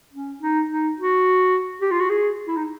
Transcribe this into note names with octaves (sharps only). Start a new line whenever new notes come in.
C#4
D#4
D#4
F#4
G4
F4
F#4
G#4
E4
D#4